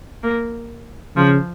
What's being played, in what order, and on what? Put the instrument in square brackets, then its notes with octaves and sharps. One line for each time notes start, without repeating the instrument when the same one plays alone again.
[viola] A#3
[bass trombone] C#3 [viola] F3